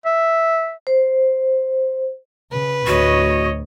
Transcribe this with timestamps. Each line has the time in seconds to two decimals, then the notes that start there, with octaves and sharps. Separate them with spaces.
0.05 E5
0.87 C5
2.51 C#3 B4
2.87 D2 A2 F#4 C#5 D#5